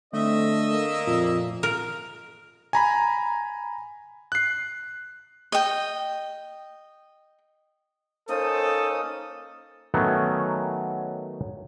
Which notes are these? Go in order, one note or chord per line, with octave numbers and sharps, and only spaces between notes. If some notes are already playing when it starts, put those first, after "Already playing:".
D3 A3 C4 D#5 E5
A#3
F2 A#2
A#4
G#5 A#5 B5
F#6 C7
D#5 G5
A#3 C#4 D#4 A4 C5 D#6
D#3 F#3 A3 B3 C#4